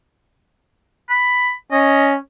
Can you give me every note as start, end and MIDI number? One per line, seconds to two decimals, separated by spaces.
1.10 1.53 83
1.72 2.18 61
1.72 2.11 75